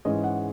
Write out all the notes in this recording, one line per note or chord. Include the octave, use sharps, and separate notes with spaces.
G#2 E3 G#3 C#4 D#5
F#5